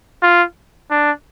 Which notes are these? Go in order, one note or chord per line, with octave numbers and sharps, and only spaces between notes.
F4
D4